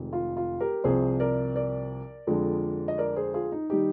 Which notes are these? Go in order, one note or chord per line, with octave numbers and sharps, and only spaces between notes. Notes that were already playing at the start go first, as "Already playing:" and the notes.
Already playing: F1 F2 D#3 G#3
F4
F4
G4 A#4
C2 C3 F3 G#4 C5
A#4 D5
A#4 D5
F2 D3 F3 G#3
D#5
A#4 D5
G#4 C5
F4 G#4
D#4
D#3 G3 D#4 G4